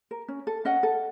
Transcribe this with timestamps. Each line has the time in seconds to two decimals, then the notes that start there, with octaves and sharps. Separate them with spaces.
0.11 A#4
0.28 C#4
0.47 A4
0.65 C#4 D#5 F#5
0.83 A4